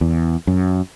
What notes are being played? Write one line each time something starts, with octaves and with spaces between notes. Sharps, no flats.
E2
F#2